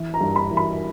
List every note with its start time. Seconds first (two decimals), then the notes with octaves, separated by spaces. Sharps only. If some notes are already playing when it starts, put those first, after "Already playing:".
Already playing: E3
0.14 A#5
0.21 G2
0.36 B5
0.50 E3
0.57 B5